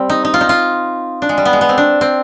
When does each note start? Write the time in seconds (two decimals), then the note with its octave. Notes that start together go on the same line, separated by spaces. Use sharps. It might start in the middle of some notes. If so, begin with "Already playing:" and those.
Already playing: G3 C4
0.10 D#4
0.25 D#4
0.34 F4
0.41 D#4
0.49 F4
1.22 D4
1.29 G#3
1.38 G3
1.45 B3
1.53 G#3
1.61 B3
1.69 C4
1.78 D4
2.01 C4